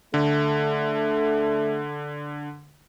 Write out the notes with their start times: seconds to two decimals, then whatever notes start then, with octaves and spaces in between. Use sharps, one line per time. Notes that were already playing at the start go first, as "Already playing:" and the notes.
0.14 D3 A3